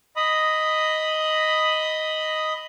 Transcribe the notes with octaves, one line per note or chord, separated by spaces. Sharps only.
D#5 B5 D#6